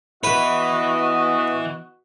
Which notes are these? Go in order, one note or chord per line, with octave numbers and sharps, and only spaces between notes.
E3 B3 E4 F#4 B4 D#5